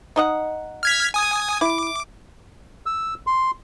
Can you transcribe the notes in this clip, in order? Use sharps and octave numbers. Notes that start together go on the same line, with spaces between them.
D#4 D#5 F#5
F6 G#6 B6
G#5 D#6
E4 D6
E6
C6